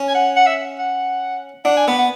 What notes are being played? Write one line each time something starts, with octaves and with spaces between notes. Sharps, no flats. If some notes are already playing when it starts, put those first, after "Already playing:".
Already playing: C#4
G#5
F#5
F#5
E5
F#5
D4 F#5
G#5
B3 F#5
F#5